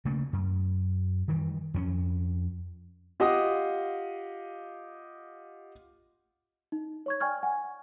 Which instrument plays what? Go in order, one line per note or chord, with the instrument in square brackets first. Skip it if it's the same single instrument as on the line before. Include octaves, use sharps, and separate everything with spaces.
[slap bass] C#3 A3 A#3
F#2
D#3 E3 G3
F2 A#3 C#4
[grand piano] F4 G4 D#5 F5 F#5 D#6
[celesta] D#4
C#5 C#6 G#6
D5 G5 G#5 C#6 F6 G#6
F#5 G#5